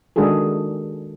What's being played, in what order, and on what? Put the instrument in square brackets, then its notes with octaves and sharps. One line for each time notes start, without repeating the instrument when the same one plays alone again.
[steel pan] D#3 G#3 D4 F#4 G#4 A4